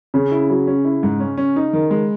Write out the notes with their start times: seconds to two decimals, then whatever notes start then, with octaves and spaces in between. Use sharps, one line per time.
0.14 C#3 C#4
0.31 E4
0.50 F#3
0.67 C#4
0.85 E4
1.03 G#2
1.20 C#4
1.37 C#4
1.56 D#4
1.73 D#3
1.91 G#3